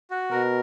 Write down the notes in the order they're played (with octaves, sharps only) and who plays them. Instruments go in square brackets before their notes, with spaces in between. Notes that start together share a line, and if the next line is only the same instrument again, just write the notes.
[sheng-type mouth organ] F#4
[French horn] B2 [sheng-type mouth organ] A#4